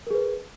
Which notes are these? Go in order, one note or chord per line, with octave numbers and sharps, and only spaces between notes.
G#4 A#4 B4